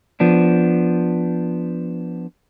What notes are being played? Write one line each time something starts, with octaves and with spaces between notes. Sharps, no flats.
F3 B3 D4